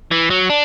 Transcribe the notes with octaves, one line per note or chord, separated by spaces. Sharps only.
E3
F#3
D4